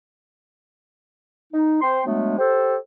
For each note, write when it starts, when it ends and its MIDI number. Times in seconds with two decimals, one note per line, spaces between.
1.53 1.79 63
1.81 2.00 60
1.81 2.00 72
1.81 2.00 79
1.81 2.00 84
2.06 2.38 54
2.06 2.38 56
2.06 2.38 57
2.06 2.38 59
2.06 2.38 62
2.39 2.76 67
2.39 2.76 69
2.39 2.76 72